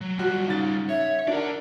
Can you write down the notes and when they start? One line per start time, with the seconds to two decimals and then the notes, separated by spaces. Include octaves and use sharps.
0.01 F#3
0.19 G3 F4 F#4
0.48 G#2 C#3 A6
0.89 C#5 E5
1.28 D4 A#4 D5 F#5